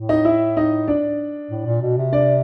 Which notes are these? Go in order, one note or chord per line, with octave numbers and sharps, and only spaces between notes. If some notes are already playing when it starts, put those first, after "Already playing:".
Already playing: A2
D#4 D#5
E4 E5
D#4 D#5
D4 D5
A2
A#2
B2
C3
D4 D5